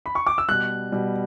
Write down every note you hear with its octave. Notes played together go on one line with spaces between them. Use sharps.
B5
C#6
D6
E6
B2 G3 F#6
B2 G3